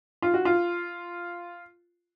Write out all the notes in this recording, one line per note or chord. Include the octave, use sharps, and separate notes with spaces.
F4
F#4
F4